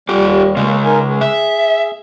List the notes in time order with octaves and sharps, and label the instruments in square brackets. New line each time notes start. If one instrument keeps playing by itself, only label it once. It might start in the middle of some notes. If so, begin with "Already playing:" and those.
[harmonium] D#2 G3 [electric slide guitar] F4 G4
[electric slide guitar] C#3 G#3 [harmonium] A#3
[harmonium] D#4 A#4 G#5
G#4
[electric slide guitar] E5